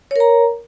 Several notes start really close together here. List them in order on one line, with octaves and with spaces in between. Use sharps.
C#5 A#4 A#5